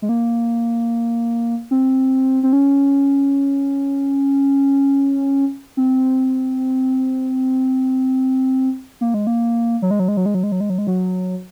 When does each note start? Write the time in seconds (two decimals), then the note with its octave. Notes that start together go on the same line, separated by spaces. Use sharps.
0.02 G#3
0.09 A#3
1.71 C4
2.43 C4
2.53 C#4
5.77 C4
9.01 A#3
9.14 G#3
9.27 A#3
9.82 F#3
9.91 G#3
10.00 F#3
10.08 G#3
10.17 F#3
10.26 G#3
10.34 F#3
10.43 G#3
10.52 F#3
10.60 G#3
10.70 F#3
10.78 G#3
10.87 F#3